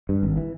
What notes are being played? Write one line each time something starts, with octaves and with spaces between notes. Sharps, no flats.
G2
G#1
E3